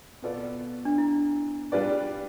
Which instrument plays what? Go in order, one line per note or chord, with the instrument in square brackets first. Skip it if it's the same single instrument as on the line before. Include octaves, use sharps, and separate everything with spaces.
[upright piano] B2 B3 F4 A4 D5
[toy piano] D4
E4
[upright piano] G3 D4 F4 B4 D5